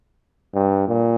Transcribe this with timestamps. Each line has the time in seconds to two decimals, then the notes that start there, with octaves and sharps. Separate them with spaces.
0.54 G2
0.88 A#2